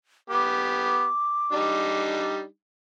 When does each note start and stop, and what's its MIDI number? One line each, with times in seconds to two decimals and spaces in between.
0.30 1.07 59
0.30 1.07 67
0.30 2.01 86
1.53 2.44 55
1.53 2.44 62
1.53 2.44 63